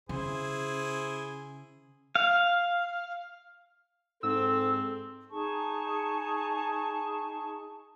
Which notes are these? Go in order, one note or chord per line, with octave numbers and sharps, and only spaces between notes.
C#3 E4 G#4 C5
F5
G#2 C4 A4 E6
D#4 G#4 A5 C#6